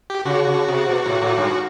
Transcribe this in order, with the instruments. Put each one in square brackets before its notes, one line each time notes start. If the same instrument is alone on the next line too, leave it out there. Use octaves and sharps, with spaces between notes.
[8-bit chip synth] G4
[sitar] C#3 [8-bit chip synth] F#4
[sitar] C#3
C3
B2
A2
A2
G2